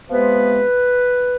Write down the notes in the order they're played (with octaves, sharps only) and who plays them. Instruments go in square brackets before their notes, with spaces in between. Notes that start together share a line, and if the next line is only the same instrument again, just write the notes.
[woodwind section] C3 F3 G#3 B3 B4